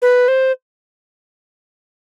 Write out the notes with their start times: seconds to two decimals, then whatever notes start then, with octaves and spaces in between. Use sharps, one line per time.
0.02 B4
0.28 C5